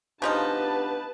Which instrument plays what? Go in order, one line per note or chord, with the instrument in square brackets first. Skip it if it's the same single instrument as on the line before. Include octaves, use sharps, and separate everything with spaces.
[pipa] C#3 F3 D#4 [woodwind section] B3 D4 G4 [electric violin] B4 A5